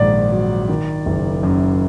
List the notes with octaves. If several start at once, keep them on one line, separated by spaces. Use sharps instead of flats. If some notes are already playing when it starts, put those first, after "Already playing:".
Already playing: A#1 G#2 D#3 D5
F#3
D#3
F#1
F#2